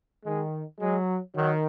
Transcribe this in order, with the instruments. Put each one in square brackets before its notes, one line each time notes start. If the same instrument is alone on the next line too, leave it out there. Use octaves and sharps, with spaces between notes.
[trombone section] D#3 [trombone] G#3
[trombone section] F#3 [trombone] G#3
[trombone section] D#3 [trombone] F#3